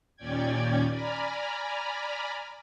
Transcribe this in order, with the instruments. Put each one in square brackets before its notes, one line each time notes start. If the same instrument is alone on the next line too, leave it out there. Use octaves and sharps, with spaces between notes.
[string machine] D#2 A#2 C#4 D5 G5 G#6
D5 G#5 A#5 B5 F6